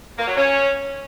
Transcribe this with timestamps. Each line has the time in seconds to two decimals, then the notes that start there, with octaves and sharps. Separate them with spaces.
0.19 A#3
0.28 F#3
0.37 C#4